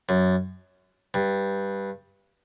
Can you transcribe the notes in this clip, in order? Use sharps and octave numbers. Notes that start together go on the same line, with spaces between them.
F#2
G2